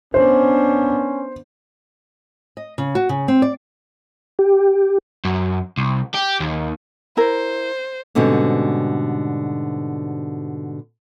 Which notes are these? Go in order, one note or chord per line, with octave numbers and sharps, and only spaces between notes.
B3 C#4 D4 C5
D#5
C#3
F#4
C#3
C4
D5
G4
F#2
C2
G4
D#2
E4 A#4 C5
G#2 B2 D3 G3 C4 C#4